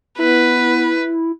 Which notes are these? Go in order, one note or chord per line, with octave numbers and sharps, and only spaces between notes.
B3 E4 B4